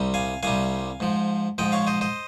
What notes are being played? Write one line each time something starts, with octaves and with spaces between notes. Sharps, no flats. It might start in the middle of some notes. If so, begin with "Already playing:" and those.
Already playing: C2 C3 G3
F5 G#5
C2 C3 G3 F5 G#5
G#2 F3
G#2 F3 D#5 G5
C#5 F5
C5 D#5
C5 D#5